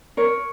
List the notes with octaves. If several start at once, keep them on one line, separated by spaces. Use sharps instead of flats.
A#4 C#5